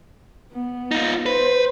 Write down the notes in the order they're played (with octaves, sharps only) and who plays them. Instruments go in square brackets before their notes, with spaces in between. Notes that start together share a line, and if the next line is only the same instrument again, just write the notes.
[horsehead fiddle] B3
[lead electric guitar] D#4 F4
[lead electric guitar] B4 [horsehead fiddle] C5